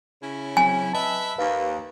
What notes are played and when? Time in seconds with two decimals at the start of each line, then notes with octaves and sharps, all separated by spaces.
0.21 C#3 C#4 E4
0.57 F#3 C4 G#5
0.94 B4 D#5 E5 A5
1.38 D#2 B4 F5